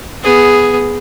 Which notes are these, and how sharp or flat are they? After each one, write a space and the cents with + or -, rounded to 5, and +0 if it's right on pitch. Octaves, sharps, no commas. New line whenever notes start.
B3 +0 G#4 +0